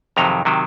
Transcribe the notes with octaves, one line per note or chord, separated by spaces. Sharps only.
F2 C3 D#3 F#3 A#5
C3 D#3 F#3